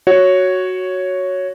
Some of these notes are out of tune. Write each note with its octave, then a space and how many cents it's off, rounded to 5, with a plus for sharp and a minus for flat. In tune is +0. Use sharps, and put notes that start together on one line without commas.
F#4 +0 C#5 +0